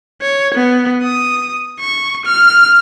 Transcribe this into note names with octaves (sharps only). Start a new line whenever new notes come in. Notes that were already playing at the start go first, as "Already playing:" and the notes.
C#5
B3
D#6
C#6
F6